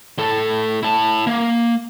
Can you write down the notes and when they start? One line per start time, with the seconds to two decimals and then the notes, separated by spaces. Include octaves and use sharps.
0.18 A2 A4
0.83 E4 A5
1.27 A#3